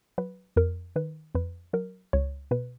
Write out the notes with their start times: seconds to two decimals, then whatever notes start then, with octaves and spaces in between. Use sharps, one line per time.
0.18 F#3 B4
0.56 F2 A#4
0.96 D#3 B4
1.35 F2 B4
1.73 F#3 A#4
2.13 C#2 C#5
2.51 B2 B4